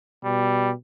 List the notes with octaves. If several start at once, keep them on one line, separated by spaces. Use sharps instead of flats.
B2 G3